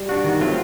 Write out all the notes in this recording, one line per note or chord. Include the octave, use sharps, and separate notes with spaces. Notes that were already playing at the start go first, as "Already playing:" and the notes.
Already playing: G3
D4 F#4
D#3
F#3 A3 C4 F4